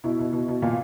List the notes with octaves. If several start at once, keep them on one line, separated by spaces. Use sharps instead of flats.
B2 E4
B2
B2
B2
A#2